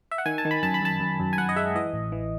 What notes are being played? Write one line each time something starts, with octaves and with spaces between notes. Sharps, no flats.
E5
F#5
D#3 G#5
A5
D#3
B5
F#2 A5
B5
F#2 A5
F#2
F#2
G#5
F#2 F#5
D#5
G#3 E5
E3 D#5
A1
E3